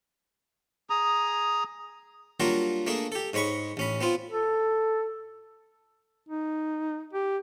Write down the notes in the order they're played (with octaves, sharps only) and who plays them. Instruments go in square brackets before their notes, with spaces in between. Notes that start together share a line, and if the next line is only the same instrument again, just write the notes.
[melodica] G#4 A#5 D#6
[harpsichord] F#3 G3 A#3 D4 F4 F#4
A3 A#3 D4 G#4
G4 A4
G#2 G#3 C#5 B5 C#6
A1 C#4 B5
B3 C4 F4
[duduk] A4
D#4
G4